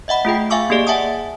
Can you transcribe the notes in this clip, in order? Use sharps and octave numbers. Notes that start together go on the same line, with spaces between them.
D#5 E5 F#5 B5
A3 F4 G#4 G5
E5 F5 G#5 C#6 D6 E6
A#3 G4 G#4 D5
E5 F#5 G#5 A5 D#6